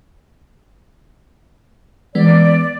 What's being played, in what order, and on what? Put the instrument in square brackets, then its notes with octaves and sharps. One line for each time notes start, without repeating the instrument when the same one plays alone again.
[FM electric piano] E3 G#3 B3 [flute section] D5